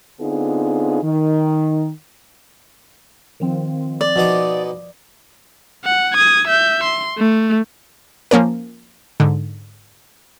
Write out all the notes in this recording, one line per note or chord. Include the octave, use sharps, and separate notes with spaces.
D3 B3 C4 D#4 F4 G#4
D#3
D#3 F3 C4
D5
B2 F3 D#4 D6
F#5
D#6 G#6
E5 G6
C6
A3
F3 A#3 C#4 A#4
G#2 D3